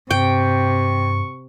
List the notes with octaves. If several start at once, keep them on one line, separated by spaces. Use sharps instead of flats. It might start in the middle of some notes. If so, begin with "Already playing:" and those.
G2 C3 G5 C#6